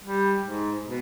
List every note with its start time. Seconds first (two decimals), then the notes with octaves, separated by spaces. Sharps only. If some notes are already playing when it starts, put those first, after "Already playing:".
0.03 G3
0.43 G#2
0.83 B2